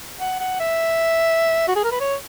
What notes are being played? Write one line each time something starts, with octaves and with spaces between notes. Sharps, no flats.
F#5
F#5
E5
F#4
G#4
A#4
B4
C#5